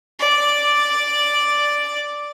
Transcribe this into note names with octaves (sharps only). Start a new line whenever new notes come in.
D5 D6